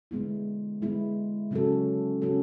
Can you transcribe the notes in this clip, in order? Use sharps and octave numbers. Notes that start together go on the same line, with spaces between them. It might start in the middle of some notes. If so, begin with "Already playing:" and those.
D3 G#3 B3 E4
D3 G#3 B3 E4
C#3 F#3 C#4 F#4 A4
C#3 F#3 C#4 F#4 A4